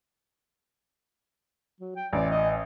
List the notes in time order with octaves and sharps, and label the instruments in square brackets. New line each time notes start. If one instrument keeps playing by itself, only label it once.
[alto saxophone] F#3
G5
[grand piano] A1 [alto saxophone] D5
[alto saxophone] D#5